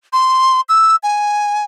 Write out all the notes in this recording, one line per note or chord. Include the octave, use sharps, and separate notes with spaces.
C6
E6
G#5